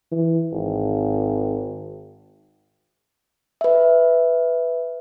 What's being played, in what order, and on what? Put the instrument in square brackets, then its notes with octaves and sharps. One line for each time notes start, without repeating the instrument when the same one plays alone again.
[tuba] E3
G#1
[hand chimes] B4 E5